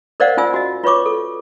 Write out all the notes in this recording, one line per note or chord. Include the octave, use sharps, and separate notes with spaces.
A#4 C5 D5 D#5 F5 F#5
C#4 F4 G#5 E6
F#4 D#5
F4 B4 C#5 C#6 D6
A4